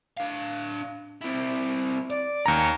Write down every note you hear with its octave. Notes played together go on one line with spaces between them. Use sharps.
D4 F5
C4 E4
D5
D#2 C#4 A#5